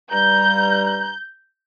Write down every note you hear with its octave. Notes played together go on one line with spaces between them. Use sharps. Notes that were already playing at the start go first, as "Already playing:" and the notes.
G2 G3 A#5 G6